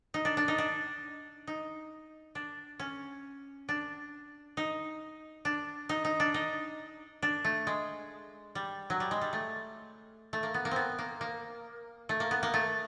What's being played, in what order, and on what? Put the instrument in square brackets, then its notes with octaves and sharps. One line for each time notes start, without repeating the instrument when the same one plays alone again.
[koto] D#4
D4
D4
D#4
D4
D#4
D4
C#4
D4
D#4
D4
D#4
D#4
D4
D#4
D4
A3
G#3
G3
F#3
G3
G#3
G3
A3
A3
A#3
B3
A#3
B3 C4
A#3
A#3
A3
A#3
B3
A#3
A3